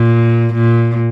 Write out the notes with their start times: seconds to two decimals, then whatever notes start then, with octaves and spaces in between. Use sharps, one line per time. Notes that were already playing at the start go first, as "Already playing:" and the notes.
Already playing: A#2
0.54 A#2